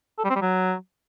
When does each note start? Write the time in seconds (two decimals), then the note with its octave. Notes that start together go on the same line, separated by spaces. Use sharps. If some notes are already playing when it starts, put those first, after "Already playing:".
0.19 A4
0.24 G3
0.30 C4
0.36 G3
0.42 F#3